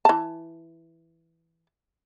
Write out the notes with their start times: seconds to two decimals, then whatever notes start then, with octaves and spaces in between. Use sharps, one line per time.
0.05 E3 A5